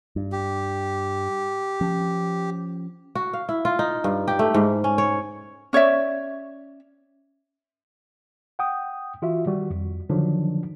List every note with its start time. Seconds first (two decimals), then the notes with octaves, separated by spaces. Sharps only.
0.16 G2
0.32 G4
1.81 F3 C#4
3.15 F#4
3.33 F5
3.49 E4
3.65 F4
3.79 D#4
4.04 G2
4.28 G4
4.39 A3
4.54 G#2
4.84 C#4
4.98 C#5
5.73 C#4 C#5 D5 E5
8.59 F#5 G5 D#6
9.22 E3 F4 F#4 E5
9.46 D#3 G3 F#4
9.70 F2
10.10 D3 D#3 F3 F#3 D4 D#4